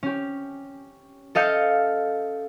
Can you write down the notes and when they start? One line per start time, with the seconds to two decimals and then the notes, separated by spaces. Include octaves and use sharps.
0.03 C#4 G4
1.35 A4 D#5 F5 G6 C#7